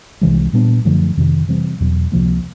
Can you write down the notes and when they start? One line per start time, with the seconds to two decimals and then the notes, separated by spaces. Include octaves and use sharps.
0.21 C2 C3 E3 G#3
0.53 A#2 G3 B3 D4
0.85 F#2 D3 F3 A3
1.17 F2 C3 D#3
1.49 C3 E3 G3 C4
1.80 E2 B2 F#3
2.12 C#2 C3 F3 A#3